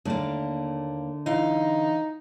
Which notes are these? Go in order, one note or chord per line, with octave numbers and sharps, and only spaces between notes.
D#2 D3 A3 A#3 D5
E3 D#4 F5